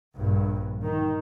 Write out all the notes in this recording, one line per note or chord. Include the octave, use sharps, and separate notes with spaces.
A#1 G2
D#3